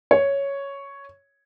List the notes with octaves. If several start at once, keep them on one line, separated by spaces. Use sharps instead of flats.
C#5